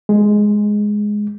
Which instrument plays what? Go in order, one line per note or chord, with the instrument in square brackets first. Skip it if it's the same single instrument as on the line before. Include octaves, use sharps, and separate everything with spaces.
[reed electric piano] G#3